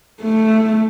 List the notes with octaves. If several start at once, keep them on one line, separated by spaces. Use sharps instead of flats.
A3